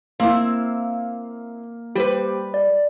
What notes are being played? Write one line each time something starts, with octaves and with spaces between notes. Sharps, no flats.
A#3 C4 E4 F5
G3 G4 B4 C5
D5